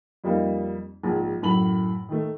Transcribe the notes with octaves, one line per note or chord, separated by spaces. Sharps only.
F2 G3 A#3 D#4
A#1 G#2
F#2 A2 B5 F#7
D#3 A3